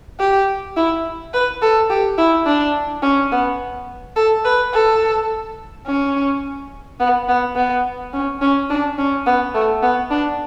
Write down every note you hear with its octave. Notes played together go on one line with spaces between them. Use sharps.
G4
E4
B4
A4
G4
E4
D4
C#4
B3
A4
B4
A4
C#4
B3
B3
B3
C#4
C#4
D4
C#4
B3
A3
B3
D4